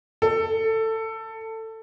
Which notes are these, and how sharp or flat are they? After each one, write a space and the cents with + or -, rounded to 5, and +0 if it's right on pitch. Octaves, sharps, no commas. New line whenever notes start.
A4 +20